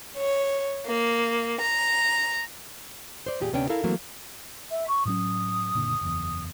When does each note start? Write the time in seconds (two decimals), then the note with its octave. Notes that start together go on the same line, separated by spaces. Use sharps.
0.16 C#5
0.85 A#3
1.60 A#5
3.26 C5 D5
3.40 E2 A#2 G4 G#4
3.52 D2 C3 B3 C#4 D4 G5
3.69 E4 A4 A#4 F5
3.84 E3 F#3 A3 A#3 C4
4.70 E5
4.88 C#6
5.05 A2 F#3 C#4 D#6
5.75 F#1 A#2 D3
6.01 F#1 E2